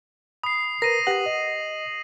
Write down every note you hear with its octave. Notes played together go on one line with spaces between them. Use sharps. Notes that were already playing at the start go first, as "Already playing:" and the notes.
B5 D#6 C7
A#4 B4 A#6 D#7
G4 B4 F#5 A#6 F#7
D#5